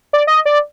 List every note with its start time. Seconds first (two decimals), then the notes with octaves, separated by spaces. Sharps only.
0.13 D5
0.27 D#5
0.45 D5